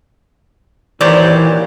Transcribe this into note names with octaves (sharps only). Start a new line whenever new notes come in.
D#2 A#2 E3 F#3 G4 C5 D5